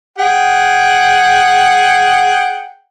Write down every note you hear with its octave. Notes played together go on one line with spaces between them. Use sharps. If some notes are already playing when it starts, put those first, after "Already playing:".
G#4 F#5 G5